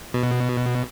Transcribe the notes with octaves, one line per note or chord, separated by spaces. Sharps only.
B2